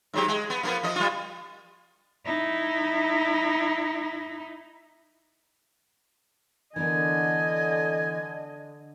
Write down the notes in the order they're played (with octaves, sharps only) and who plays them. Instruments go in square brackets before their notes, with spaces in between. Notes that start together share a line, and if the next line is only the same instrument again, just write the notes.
[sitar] G#2 F#3 G4
G#3
B3
F3 A#3 B3
F3 D#5
G3 F4
[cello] D#4 E4
[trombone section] D3 [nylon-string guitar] E3 B3 A#4 [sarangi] D#5 [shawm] G#5